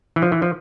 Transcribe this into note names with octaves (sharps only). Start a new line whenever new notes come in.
E3
F3
E3
F3